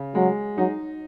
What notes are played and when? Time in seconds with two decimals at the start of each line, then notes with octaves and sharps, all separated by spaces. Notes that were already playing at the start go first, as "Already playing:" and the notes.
Already playing: C#3
0.15 F#3 G#3
0.57 F#3 D#4